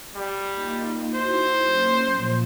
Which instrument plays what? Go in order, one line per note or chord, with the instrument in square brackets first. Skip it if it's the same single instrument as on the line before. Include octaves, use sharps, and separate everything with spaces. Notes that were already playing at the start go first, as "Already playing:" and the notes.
[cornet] G3
[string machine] A#3 D#4 F4
[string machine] D#4 E4 F#4 [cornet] C5
[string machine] F#3 A#3 C#4
A#2 F3